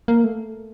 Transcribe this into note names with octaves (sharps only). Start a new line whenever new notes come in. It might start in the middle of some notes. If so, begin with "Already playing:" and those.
A#3
A3